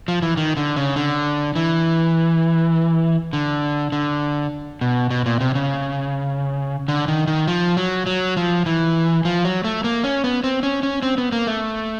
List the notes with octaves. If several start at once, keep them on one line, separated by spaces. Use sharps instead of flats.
F3
E3
D#3
D3
C#3
D3
E3
D3
D3
B2
B2
A#2
C3
C#3
D3
D#3
D#3
F3
F#3
F#3
F3
E3
F3
F#3
A3
A#3
C#4
B3
C4
C#4
C#4
C4
B3
A#3
A3